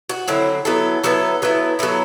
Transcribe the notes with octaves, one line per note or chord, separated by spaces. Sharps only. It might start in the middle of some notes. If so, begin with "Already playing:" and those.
F#4
D3 F#3 C4 E4
F#3 B3 E4 A4
F#3 B3 E4 A4
F#3 B3 E4
F#3 B3 E4 A4